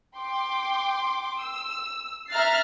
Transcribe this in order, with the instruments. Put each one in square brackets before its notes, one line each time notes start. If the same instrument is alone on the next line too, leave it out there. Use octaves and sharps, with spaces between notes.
[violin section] G5 C6 D6
E6
E5 A#5 F6 F#6 A6 C7